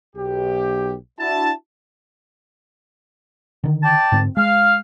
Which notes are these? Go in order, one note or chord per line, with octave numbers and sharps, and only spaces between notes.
B1 G4
D4 E4 F#4 A5
D3 D#3
D5 G5 A5
G#2 D3 C4
G#3 F5